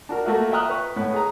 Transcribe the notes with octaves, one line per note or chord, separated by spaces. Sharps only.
D4 F#4 A#4
A3 A#3 F#4 E5
E5 G5 A#5 D#6 F6 F#6
B4 C#6
A2 B3
G#4 A#5